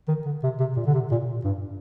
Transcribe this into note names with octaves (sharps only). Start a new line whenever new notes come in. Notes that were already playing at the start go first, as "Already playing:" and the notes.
D#3
D3
C3
C3
A#2
D3
C3
A#2
G2